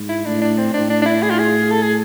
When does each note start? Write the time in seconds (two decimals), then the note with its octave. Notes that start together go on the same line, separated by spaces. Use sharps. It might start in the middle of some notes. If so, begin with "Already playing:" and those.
Already playing: G#2
0.09 E4
0.25 A2 D4
0.42 D4
0.58 C4
0.73 A2 D4
0.90 D4
1.02 D4
1.06 E4
1.22 G#4
1.30 F4
1.39 G#4
1.71 A4
1.82 G#4